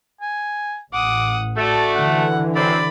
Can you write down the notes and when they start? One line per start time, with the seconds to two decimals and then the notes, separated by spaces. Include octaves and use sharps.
0.21 G#5
0.93 A1 F#5 D6 D#6
1.57 A3 F#4 D5 A5
1.95 D3 E3 F#5
2.56 F#2 C4 D5 B5